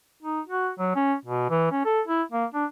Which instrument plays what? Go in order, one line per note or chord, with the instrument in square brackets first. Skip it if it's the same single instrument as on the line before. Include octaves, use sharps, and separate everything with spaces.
[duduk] D#4
F#4
F#3
C#4
B2
E3
C#4
A4
E4
A#3
D4